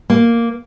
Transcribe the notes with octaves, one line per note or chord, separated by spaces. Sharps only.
A#3